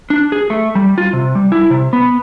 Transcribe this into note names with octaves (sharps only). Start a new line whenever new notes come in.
D4
G#4
A3
G3
F4
C3
G3
E4
C3
B3